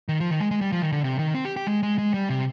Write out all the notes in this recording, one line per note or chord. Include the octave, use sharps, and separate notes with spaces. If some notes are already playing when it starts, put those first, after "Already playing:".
D#3
F3
D#3
G#3
G#3
G3
F3
D#3
D3
C3
D#3
C4
G4
G4
G#3
G#3
G#3
G3
C3